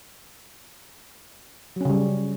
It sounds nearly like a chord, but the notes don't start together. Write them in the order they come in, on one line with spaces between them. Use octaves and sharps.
F#3 C#4 C#3 G3